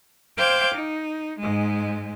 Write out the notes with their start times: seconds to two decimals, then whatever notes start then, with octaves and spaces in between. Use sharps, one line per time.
0.38 C5 F5 G5 D6 G6 G#6
0.74 D#4
1.39 G#2 G#3